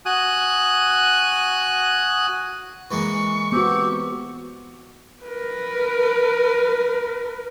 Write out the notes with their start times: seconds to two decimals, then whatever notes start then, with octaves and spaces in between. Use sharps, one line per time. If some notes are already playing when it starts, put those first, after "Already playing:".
0.06 F#4 G#5 D#6 F#6
2.91 E3 G#3 A#3 C#6
3.52 B3 C4 F#4 G4
5.24 A#4 B4